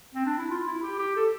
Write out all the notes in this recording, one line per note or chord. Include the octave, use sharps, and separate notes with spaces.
C4
D4
E4
F4
E4
G4
G4
A4